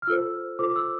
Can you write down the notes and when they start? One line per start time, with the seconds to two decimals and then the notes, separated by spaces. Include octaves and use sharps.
0.02 F6
0.07 F4 A4 C5 E6
0.59 F4 A4 C5 D6
0.76 E6